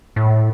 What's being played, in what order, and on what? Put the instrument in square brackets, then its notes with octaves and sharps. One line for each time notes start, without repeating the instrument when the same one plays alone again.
[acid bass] A2